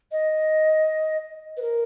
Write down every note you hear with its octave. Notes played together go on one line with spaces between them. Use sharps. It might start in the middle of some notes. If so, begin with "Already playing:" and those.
D#5
B4
A#4